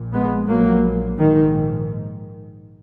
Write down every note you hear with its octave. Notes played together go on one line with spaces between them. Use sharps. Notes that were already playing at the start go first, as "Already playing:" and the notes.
Already playing: A#1 A#2
G#3 B3
A#1 A#2 F#3 A#3
A#1 G#2 D#3